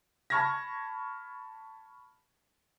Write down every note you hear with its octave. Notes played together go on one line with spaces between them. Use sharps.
A5 B5 C#6 F6 G#6 A#6